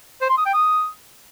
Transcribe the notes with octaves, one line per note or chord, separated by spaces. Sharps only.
C5
C6
D#6
G5
D#6